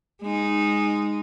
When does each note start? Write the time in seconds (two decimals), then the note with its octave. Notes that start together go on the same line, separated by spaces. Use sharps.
0.22 G#3 D#4